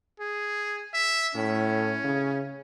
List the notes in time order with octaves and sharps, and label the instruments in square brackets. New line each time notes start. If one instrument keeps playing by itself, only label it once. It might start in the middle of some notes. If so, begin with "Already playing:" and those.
[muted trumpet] G#4
E5
[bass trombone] A2 [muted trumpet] C#4
[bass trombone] C#3